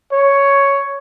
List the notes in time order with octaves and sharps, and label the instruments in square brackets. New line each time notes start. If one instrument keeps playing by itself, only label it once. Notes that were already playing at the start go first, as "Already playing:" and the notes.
[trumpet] C#5